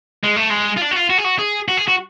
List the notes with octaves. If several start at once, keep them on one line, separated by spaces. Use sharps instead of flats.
G#3
A3
G#3
F4
D4
F#4
F4
F#4
G#4
F#4
G#4
F#4
G#4
F#4